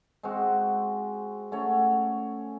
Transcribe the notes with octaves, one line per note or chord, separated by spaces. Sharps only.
G#3 C4 F#4
A3 C#4 F#4 C#5